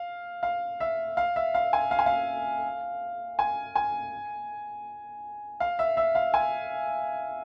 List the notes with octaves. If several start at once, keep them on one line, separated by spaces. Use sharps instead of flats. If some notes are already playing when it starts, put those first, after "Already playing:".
Already playing: F5
F5
E5
F5
E5
F5
G#5
F5
G#5
F5
G#5
G#5
F5
E5
E5
F5
G#5